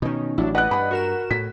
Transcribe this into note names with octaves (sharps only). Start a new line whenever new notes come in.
B2 D#3 C#4 D#4
A1 F#3 D4 E4
B4 D5 D#5 F#5 F#6
G2 F#5 B5
F#4 A#4 E7
A2 B6